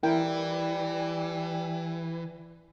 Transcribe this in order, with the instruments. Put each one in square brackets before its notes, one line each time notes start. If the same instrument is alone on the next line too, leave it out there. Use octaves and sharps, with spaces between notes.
[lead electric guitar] E3 [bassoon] G3 [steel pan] E4 A#4 G5